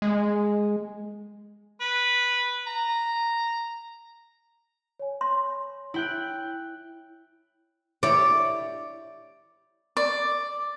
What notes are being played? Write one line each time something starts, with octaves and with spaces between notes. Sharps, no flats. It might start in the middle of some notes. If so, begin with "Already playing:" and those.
G#3
B4
A#5
C#5 G#5
C6
E4 G5 F#6
E4 G4 C#5 D5
D5